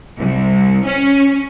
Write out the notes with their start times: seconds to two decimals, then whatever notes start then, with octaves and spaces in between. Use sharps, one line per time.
0.17 C2
0.85 C#4